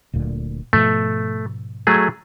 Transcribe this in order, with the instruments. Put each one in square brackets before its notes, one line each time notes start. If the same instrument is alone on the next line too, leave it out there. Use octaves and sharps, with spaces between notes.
[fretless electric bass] D1 D2 A#2
[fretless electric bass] G#2 B2 F3 [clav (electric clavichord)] A3
[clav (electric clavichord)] F#3 A3 G#4